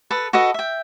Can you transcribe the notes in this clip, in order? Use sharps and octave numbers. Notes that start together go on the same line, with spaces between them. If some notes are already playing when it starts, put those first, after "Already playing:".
A4 B4 D#6
F#4 A4 B4 D#5
E5 G5